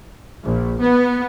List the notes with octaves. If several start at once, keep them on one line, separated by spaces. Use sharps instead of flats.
A#1
B3